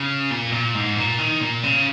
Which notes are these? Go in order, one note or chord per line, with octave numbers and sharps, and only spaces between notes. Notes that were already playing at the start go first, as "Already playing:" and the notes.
Already playing: C#3
A#2
A#2
G#2
A#2
D#3
A#2
C#3